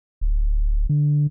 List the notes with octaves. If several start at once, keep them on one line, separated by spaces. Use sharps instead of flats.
D1
D3